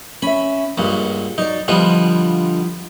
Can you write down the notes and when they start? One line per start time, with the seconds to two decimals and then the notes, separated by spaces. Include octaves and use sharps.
0.22 C#4 E5 B5
0.78 C#2 G2 A#2 F#5
1.38 F#3 D#4 D5
1.68 D3 F3 G3 B3 F4 D#5